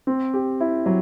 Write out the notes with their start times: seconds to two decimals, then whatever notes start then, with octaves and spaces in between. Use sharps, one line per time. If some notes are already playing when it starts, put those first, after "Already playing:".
0.07 C4
0.34 G4
0.61 E4
0.86 F#3